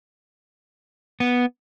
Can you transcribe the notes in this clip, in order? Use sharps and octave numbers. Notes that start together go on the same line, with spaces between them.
B3